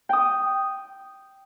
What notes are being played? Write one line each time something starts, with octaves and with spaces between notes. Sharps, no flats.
G5 D#6